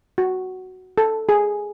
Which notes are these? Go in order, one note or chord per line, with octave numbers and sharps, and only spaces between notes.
F#4
A4
G#4